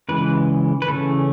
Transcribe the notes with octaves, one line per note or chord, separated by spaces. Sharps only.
C#3 E3 G#3 B4
B4
C#3 E3 A3 C#4 A4